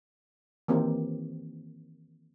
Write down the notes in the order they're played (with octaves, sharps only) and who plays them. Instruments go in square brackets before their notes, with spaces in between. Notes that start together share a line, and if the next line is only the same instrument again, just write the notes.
[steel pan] D#3 E3 A#3 C4 G4